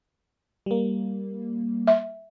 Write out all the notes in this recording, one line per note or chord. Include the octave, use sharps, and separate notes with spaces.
G3 A#3
E5